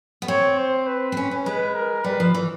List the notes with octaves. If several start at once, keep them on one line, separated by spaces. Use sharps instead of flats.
B3
C4 C#5
C5
B4
C4
C#4
C#4
G#3 B4
A#4
G3 B4
F3
E3